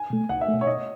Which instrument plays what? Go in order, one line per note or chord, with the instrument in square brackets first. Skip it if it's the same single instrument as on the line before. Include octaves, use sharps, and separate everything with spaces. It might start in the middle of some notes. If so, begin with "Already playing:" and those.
Already playing: [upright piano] G#5
[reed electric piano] B2 A3
[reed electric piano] C#2 [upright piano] F#5
[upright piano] E5
[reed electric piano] B2 A3
[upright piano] C#5
[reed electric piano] B2 [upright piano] D#5